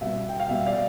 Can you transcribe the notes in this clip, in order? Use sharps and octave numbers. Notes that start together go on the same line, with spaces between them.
B2 G3 B3 E5
G5
F5
B2 G3 B3 E5
D5 F5